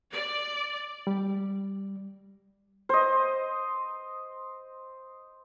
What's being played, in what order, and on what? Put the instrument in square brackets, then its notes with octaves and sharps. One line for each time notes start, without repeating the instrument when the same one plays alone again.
[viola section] D5
[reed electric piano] G3
[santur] C5 D#5